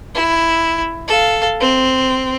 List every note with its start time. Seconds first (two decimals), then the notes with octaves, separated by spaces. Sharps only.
0.15 E4
1.08 A4 F5
1.61 C4